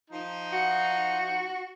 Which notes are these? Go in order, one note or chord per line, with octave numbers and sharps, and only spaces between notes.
F3 D#4
F#4